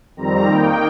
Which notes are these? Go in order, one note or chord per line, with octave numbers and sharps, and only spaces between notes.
F2 D#3 G3 C4 A#5
D#3 A#3 D#4 G5